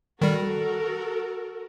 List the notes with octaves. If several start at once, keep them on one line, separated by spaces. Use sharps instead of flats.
D#3 G3 F#4 A4 A#4